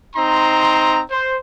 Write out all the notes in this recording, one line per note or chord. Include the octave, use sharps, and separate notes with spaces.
C4 D#4 A#5 C6
C5